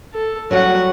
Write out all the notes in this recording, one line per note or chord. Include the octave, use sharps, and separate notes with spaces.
A4
F#3 G3 C#4 F#4 F#5